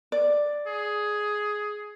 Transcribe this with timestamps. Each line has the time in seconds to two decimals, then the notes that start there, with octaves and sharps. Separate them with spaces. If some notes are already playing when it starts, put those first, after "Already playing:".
0.12 D5
0.67 G#4